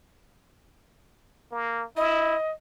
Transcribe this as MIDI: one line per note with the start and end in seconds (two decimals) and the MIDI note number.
1.51 1.85 58
1.96 2.35 64
1.96 2.50 75